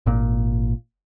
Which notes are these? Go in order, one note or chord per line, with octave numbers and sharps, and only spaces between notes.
G#1 A#2